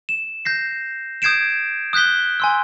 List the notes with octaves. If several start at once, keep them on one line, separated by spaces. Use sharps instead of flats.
E7
G6 A#6 C7
D#6 G6 G#6 C7 D7 E7
D#6 F#6 G6 B6 G7
G#5 C6 E6